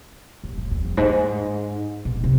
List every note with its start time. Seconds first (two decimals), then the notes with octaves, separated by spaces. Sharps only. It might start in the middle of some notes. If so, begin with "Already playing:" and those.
0.44 A2
0.58 A2
0.71 E2
0.85 F2
0.97 G#2
2.05 B2
2.24 C3